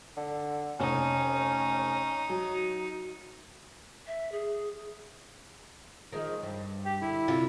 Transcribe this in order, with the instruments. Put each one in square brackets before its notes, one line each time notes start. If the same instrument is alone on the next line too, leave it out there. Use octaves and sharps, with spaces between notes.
[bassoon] D3
[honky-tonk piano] F1 [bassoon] C#4 [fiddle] D#4
[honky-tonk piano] F#3
[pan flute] E5
G#4
[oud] D#3 F3 G#3
G2
[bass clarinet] G4
[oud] D3 [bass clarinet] E4
[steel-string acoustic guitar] C3 F4